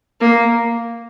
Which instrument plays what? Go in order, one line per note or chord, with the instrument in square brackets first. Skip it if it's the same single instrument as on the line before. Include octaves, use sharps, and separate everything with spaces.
[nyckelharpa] A#3